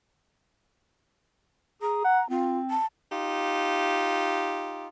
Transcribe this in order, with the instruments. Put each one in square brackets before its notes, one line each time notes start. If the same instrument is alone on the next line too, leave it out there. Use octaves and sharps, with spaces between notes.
[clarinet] G#4 [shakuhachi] A#5
[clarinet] F#5
[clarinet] C4 [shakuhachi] F4
[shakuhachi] A5
[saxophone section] D#4 F4 G4